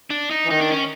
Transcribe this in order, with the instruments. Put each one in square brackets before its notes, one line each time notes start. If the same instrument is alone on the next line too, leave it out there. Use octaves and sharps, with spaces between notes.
[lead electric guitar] D4
D#4
[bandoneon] E3
[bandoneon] D#3 [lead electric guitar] D#4
[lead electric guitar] D4
C#4